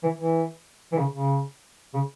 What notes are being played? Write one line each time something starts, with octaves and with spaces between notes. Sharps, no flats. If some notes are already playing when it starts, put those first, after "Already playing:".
E3
E3
E3
C#3
C#3
C#3